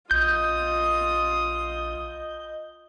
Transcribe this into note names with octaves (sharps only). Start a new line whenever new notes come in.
A#1 F4 D#5 D#6 G6